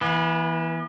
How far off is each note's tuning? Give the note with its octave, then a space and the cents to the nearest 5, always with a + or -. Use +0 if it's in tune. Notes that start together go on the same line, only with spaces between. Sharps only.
E3 +0 B3 -40